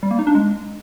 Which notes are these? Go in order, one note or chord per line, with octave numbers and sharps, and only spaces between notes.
G3
A#3
D#4
D4
G#3